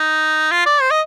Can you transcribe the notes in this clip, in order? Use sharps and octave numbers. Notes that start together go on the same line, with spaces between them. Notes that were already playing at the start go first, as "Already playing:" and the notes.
Already playing: D#4
F4
D5
C5
D#5